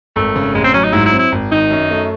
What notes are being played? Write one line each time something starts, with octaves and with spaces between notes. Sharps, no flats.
G#1 A3
C#3
A1 G#3
C4
F#3 C#4
D#4
G#2 E4
E4
C4
E4
G#1
D#3 D#4
F#2
A3